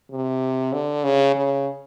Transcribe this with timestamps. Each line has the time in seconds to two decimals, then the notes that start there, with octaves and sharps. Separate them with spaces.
0.11 C3
0.73 D3
1.04 C#3
1.35 C#3